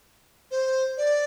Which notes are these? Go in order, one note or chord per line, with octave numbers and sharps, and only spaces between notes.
C5
D5